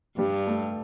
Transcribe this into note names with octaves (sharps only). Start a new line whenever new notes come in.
G2 G3
A3